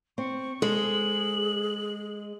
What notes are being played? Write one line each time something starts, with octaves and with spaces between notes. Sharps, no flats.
C4 C#6
G#3 G#4 A4 C5 F#7